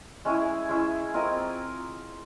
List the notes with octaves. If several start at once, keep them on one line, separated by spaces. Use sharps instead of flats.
G#3 C#4 E4 G#4
G#3 C#4 E4 G#4
C4 F4 A#4 D#5